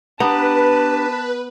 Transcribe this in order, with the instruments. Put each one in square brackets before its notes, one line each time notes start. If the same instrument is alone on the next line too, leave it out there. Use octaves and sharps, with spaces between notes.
[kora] B3 [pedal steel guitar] D4 G4 A#5 [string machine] B4 [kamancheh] A5